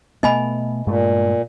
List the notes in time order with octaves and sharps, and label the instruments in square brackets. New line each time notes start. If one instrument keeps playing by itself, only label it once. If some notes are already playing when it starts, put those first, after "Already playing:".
[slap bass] B2 A3 B3 [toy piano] D#5 G#5 B5
[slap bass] G2 G#3 A3 [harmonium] A#2